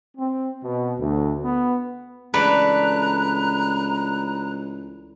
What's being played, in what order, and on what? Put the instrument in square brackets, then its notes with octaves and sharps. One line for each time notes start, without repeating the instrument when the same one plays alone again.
[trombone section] C4
B2
D2
B3
[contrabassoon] C#2 [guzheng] E3 A3 D4 [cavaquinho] B4 [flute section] A#5 F#6